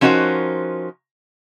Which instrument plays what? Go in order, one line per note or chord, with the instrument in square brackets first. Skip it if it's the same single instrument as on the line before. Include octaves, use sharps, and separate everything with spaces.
[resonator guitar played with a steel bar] F3 C#4 D#4 F#4 A#4 C5